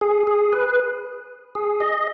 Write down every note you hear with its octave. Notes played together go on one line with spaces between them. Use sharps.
G#4
G#4
B4
G#4
D#5